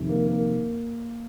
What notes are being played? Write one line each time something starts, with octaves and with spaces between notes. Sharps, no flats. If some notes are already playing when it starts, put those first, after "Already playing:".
Already playing: F2 C3 D#3
A#3
A#3